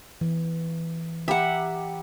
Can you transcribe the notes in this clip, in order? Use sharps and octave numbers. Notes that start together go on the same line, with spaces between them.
E3
G4 E5 F#5 A#5 B5